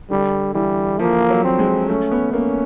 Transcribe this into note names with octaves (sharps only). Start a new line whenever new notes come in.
D3 G3
E3 G3
F3 A#3
F#3
C4
G#3
A3 C#4
B3
A#3 C#4